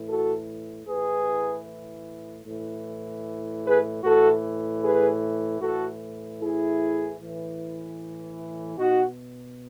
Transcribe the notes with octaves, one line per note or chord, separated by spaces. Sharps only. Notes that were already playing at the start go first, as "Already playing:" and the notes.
Already playing: A2 E3
F#4 A4
A2 E3 G#4 B4
A2 E3
G#4 B4
A2 E3 F#4 A4
G#4 B4
A2 E3 F#4 A4
E4 G#4
A2 E3
B2 D#4 F#4